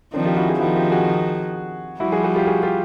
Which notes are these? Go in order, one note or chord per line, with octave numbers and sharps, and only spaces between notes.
D#3 F3 C4 D4
F4 G4
E4 F#4
F#4 G#4
D#3 F3 E4 F#4
F4 G4
F#4 G#4
F3 G3 E4 F#4
F#4 G#4
F#4 G#4
F4 G4
F#4 G#4
F4 G4